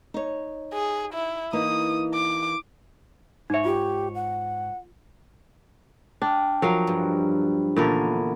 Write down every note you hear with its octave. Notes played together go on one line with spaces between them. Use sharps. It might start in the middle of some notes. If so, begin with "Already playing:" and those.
D#4 C#5
G#4
E4
E3 A#3 D#4 D#6
D6
G#2 D#4 C#5 E5
F4 G4
F#5
D4 G5 F6
F3 F#3 A#4 F5
G2
A#2 D3 E3 B3 C#4 A#4